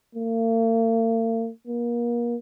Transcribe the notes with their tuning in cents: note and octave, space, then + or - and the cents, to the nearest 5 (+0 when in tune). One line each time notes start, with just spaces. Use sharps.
A#3 -45
A#3 +35